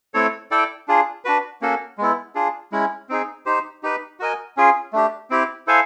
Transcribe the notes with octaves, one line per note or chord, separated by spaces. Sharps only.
A3 C4 E4 A4 C#5
E4 A4 D5 G5
D4 F4 G#4
D4 F#4 B4
A#3 C#4 F#4 A4
G#3 B3 E4
D4 F4 G#4
G#3 C#4 E4
C4 D#4 G#4
D#4 G4 C5
D#4 G4 B4
F#4 A#4 D#5 G#5
C#4 F4 G#4
A3 D4 G4
C4 E4 G4
E4 A4 C5 F5 G#5